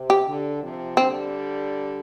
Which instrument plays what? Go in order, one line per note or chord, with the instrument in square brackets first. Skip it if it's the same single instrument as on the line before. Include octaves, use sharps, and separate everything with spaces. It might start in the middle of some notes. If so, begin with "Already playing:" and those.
Already playing: [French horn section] C3
[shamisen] G4
[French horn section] D3
C3 F3
[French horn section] D3 G3 [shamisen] C4